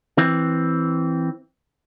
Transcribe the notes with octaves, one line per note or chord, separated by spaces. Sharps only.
E3 C4